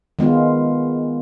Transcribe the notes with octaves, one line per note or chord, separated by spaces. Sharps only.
D#3 G#3 B3 F4